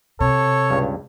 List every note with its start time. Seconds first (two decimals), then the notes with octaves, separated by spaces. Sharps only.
0.20 C3 A4 C#5
0.70 C#2 G2